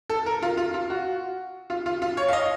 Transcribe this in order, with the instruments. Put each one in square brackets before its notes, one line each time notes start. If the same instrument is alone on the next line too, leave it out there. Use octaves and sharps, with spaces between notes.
[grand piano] A4
A#4
F4
F4
F4
F#4
F4
F4
F4
C#5
F5
D#5